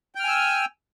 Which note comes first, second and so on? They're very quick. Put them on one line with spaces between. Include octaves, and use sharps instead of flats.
G5 F6 G#5 E6